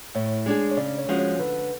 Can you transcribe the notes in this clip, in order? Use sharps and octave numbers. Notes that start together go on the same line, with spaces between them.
A2 C#5
G#3 D4 G#4
C#5
C#3 D5
C#5
F3 G#3 C#4 F#4
C#5
D3 B4